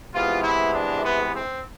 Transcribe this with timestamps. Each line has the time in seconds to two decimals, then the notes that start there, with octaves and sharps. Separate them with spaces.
0.14 C3 E3 G#3 B3 F4
0.44 E4
0.74 D4
1.04 B3
1.34 C4